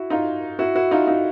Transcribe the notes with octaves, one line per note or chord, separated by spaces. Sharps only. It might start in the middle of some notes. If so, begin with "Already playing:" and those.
Already playing: E4 F#4
D#4 F4
E4 F#4
E4 F#4
D#4 F4
D#4 F4